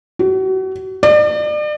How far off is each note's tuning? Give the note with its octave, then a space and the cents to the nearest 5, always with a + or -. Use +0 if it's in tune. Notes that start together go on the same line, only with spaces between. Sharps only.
F#4 +35
D5 +40